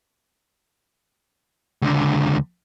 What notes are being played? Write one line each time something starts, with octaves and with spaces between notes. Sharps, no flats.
C#2 D3